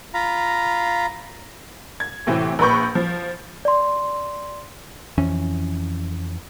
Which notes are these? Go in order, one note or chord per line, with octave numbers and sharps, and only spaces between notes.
F4 F5 A#5 B5
G#6
A2 C3 E3 C4
A#1 A#3 B4 B5 C#6 G6
F3
D5 C6
F2 E3 C#4